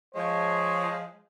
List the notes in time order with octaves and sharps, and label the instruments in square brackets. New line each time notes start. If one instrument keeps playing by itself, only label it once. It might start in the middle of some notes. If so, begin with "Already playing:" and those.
[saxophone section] F3 G#3 [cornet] C#5